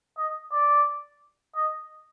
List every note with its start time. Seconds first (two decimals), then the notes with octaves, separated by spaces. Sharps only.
0.18 D#5
0.52 D5
1.56 D#5